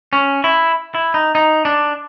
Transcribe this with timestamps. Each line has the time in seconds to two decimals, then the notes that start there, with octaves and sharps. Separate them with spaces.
0.13 C#4
0.44 E4
0.95 E4
1.14 D#4
1.35 D#4
1.65 D4